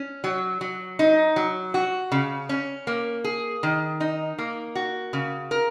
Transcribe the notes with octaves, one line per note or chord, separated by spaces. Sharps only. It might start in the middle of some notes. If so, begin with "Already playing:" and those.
Already playing: C#4
F#3
F#3
D#4
F#3
F#4
C#3
C#4
A#3
G#4
D#3
D#4
A#3
F#4
C#3
A#4